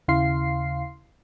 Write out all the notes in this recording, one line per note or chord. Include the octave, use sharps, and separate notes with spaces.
D#2 C#3 E4 F5 C6 C7